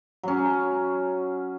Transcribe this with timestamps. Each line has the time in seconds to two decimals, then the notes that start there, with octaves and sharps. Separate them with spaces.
0.23 F#3 C#4